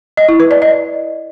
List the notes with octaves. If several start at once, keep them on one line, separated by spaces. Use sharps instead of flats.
D#5
E4
B4
D5
D#5